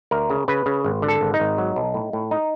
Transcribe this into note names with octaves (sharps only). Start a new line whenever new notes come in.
D2 A#4
C#3
C#3 B4
C#3
G#1
D3
A4
G#1
D#4
G#1
F#3
B1
A2
A2
D#4